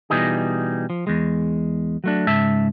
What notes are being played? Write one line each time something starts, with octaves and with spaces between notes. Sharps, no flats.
B2 E3 G3 D#4 G#4
F3
E2 G#3
F#3 A3 D4
C#2 G#2 E5 A5